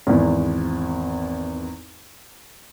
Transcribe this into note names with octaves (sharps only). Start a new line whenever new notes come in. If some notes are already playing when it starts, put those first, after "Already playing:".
G#1 E2